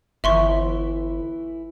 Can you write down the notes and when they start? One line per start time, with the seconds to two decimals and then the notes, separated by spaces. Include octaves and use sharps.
0.24 G1 E3 E4 E5 C6 C#6